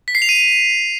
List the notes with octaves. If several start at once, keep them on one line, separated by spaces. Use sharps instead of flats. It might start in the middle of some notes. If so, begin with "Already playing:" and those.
B6
C7
F7
D#7